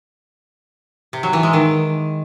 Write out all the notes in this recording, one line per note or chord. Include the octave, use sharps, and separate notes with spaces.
C3
F#3
E3
G#3
D#3